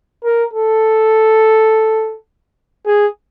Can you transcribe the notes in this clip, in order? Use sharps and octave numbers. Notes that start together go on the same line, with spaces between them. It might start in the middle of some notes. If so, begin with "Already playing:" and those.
A#4
A4
G#4